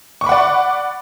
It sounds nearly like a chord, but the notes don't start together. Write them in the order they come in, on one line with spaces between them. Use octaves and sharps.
C#6 D6 B5 F#5 D5